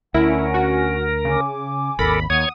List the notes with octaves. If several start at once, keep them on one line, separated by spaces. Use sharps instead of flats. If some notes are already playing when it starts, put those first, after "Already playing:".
D2 C#4 E4 A#4 F#5 G#5
F#4
C#3 G#5 D6
G#1 D#2 A4 A#4 B5
D#2 C#5 F#5 D#6 G#6